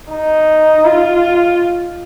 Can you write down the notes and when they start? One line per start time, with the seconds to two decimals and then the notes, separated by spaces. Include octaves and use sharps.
0.12 D#4
0.85 F4